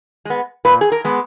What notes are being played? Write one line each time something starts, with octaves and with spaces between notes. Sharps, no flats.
G#3 B3
A#2 B4
G#4
A#4
G#3 B3